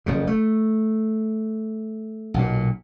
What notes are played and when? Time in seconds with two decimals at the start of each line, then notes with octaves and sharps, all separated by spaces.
0.06 F#1 F2 C#3
0.27 A3
2.34 B1 A#2